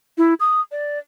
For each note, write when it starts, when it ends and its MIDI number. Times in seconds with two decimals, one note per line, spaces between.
0.18 0.34 64
0.40 0.61 87
0.71 0.99 74